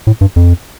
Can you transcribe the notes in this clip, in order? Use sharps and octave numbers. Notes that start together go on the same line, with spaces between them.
A2
G2
F2